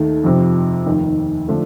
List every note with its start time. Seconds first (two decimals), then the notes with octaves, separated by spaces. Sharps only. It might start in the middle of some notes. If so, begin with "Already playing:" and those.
Already playing: D#2 D#3 A3 D#4
0.24 F2 C3 F3
0.86 F1 D#2 D#3
1.48 D3 F3 A3 D4